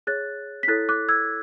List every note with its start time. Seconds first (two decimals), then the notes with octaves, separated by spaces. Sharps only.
0.07 G#4 C#5 F#6 A6
0.63 B6
0.68 E4 A4 C#5 F#6 A6
0.89 D6 F#6
1.09 E6 G#6